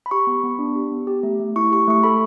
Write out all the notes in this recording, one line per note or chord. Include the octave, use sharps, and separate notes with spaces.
B5
G4 C#6
B3
B3
D4
G4
B3
G4
A3
A3
E4 C#6
G4 C#6
A3 C#6
A4 B5